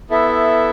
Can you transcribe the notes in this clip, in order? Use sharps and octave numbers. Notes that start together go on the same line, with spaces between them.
B3 E4 A4 E5